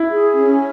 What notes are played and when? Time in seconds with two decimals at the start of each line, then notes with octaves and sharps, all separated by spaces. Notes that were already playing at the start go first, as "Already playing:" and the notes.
Already playing: E4
0.10 G#4
0.34 C#4